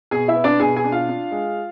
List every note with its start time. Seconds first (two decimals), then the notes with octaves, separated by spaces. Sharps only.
0.11 B2 G#4 G#5
0.28 E4 E5
0.36 B3
0.44 D4 D5
0.60 B2 G#4 G#5
0.76 G#4 G#5
0.84 D4
0.92 F4 F5
1.08 D4
1.32 G#3